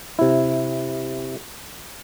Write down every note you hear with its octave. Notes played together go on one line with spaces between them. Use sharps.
C3 E4